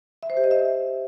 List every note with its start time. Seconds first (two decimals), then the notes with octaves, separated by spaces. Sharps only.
0.23 E5
0.30 C5
0.37 G4
0.44 D#5
0.51 E5